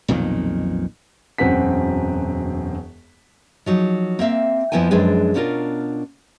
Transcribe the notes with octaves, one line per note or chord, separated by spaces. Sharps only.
B1 F2 A#2 D#3
E1 F#2 C4 F#5 B6
F3 F#3 D#4
A#3 C4 E5 F5
F2 F3 B3 E4 G5 G#5
F#2 F3 G#3 D4 G#4 B4
B2 C#4 D4 E4 F4 A#4